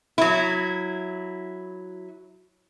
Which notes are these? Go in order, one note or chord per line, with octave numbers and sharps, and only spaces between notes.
F#3 E4